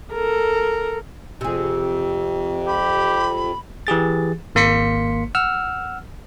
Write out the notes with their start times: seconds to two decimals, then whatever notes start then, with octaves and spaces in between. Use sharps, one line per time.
0.13 A4 A#4
1.41 F2 C3 G#4
2.67 G4 B5
3.87 E3 G4 G#4 A6
4.55 G#1 A#3 C6 B6 C#7
5.35 F#5 E6 F6